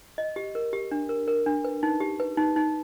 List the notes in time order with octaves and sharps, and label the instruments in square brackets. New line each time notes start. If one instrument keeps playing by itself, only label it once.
[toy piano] D#5
G4
A#4
G4
D4
A#4
A#4
D4
B4
D#4
G4
B4
D#4
D#4